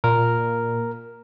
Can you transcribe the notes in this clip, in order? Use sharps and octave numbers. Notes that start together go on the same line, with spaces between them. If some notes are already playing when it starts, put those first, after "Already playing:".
A#2 A#4